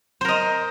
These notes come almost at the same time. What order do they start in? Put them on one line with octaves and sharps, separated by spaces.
C5 A#4 D#5